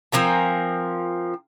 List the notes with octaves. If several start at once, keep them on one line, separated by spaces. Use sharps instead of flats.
F3 C4 A#4 G#5